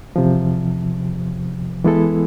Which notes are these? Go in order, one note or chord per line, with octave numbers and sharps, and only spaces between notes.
E2 C3 F3
E3 G#3 B3 E4 A4